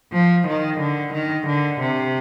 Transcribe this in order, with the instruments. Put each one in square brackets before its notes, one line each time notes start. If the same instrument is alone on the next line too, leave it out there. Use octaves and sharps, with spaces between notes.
[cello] F3
D#3
D3
D#3
D3
C3